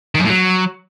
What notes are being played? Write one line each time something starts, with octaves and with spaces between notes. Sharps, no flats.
D#3
F#2
A2
F#3